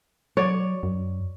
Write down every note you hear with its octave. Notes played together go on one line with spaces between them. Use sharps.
F#3 C#5 D5
F#2